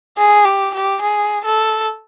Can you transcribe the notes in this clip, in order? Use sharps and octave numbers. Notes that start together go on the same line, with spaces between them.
G#4
G4
G4
G#4
A4